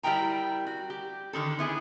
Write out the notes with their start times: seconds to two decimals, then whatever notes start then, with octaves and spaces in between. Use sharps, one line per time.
0.03 G3 E4 A#4 G5 A#5
0.66 F#4
0.90 G4
1.33 D3 D#3 C4 A4
1.59 B3 E4 G#4